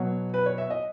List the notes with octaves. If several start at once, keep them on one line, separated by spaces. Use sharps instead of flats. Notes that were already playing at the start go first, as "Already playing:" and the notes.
Already playing: B2 F#3 C#5
B4
C#5
E5
D#5